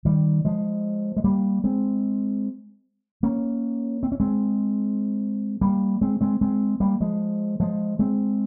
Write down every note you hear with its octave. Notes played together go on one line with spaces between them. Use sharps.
D#3 G3
F3 G#3
G#3
G3 A#3
G#3 C4
A#3 C#4
C4
C#4
G#3 C4
G3 A#3
G#3 C4
G#3 C4
G#3 C4
G3 A#3
F3 G#3
F3 G#3
G#3 C4